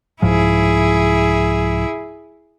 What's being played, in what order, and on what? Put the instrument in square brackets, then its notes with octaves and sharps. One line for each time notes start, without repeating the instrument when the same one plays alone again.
[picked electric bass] C2 G#2 F3 [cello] E4 G#4